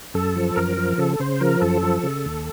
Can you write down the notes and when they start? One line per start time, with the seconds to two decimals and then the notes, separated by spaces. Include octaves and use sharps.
0.14 F#2 A4
0.36 F3
0.56 F#2 A#4
0.77 F3
0.98 C#3 A4
1.20 C#3 C5
1.40 F3 A#4
1.61 F#2 A4
1.83 F3
2.03 C#3
2.25 D#2